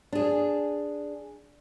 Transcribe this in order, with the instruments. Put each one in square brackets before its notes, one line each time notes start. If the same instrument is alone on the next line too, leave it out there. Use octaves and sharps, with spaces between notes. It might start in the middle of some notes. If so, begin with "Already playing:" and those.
[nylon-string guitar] D4 G#4